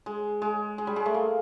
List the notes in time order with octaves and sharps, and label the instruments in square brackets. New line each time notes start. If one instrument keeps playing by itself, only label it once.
[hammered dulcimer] G#3
G#3
G#3
G3
G#3
A3
A#3